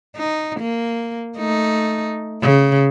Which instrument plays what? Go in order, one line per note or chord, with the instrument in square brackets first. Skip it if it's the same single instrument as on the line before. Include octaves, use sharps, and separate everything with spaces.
[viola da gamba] D#4
A#3
A3 D#4
C#3